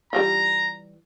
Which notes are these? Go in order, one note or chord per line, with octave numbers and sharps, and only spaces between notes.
E3 G3 F4 A#5